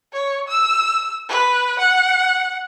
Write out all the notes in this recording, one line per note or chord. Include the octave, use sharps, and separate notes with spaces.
C#5
E6
B4
F#5